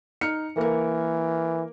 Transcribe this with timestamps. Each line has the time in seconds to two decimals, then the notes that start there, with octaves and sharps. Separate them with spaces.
0.21 D#4 F6 C#7
0.57 E3 A#3 A#4